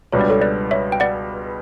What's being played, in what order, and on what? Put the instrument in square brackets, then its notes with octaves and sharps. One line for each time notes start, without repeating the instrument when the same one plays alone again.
[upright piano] C#2 B2 G3 D4 [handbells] C#5
[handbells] D5
A4 C#5
B4 D5
C#5 E5
G5
D5 F#5